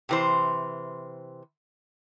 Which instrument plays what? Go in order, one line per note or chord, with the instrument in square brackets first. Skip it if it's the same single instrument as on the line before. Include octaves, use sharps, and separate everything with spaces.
[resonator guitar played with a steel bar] C3 E3 C5